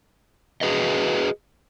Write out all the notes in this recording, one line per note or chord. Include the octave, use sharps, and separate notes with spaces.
F#4 G#4 B4 D#5